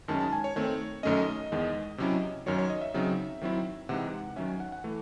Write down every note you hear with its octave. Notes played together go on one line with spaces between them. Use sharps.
F#2 D#3 G#3 C#4 A5
A5
G#5
C#5
D#3 A3 C4 C#5
F#2 D#3 A3 C#4 D#5
E2 D#3 G#3
C3 F#3 C#4 E4
F#2 D#3 F#3 C#5
C#5
D#5
E5
C#3 F#3 C4 D#4
D#3 F#3 C4 E4
C3 E3 G#3 D#4 F#5
D#3 F#3 C#4 E5
G#5
F#5
F#5
E3 A3